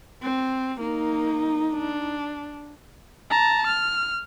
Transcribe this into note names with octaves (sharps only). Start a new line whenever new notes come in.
C4
A#3 D#4
D4
A5 A#5
F6